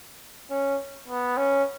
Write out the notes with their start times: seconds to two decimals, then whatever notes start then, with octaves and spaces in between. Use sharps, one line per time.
0.51 C#4
1.08 B3
1.37 C#4